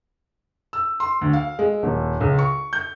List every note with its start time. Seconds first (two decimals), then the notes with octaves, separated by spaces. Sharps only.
0.73 E6
1.00 C6
1.21 D2
1.33 F5
1.59 G#3
1.83 D#1
2.21 C#2
2.39 C#6
2.73 G6